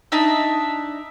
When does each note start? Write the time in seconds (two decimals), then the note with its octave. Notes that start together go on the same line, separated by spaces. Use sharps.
0.12 D4 D#4 E5